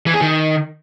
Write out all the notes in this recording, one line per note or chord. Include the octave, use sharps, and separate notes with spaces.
E3
G#4
D#3